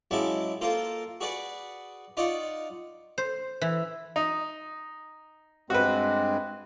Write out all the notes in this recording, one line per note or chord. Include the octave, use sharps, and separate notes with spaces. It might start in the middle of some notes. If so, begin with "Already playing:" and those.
C#3 F#3 G#3 E4 A5 D6
A#3 F4 A4 A#4 C5
F#4 G#4 B4 D5 F#5
D#4 F4 D5 F#5 C#6
C5
E3
D#4
G2 G#3 C4 F#4 B4